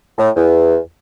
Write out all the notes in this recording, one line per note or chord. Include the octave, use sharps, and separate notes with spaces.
A2
E2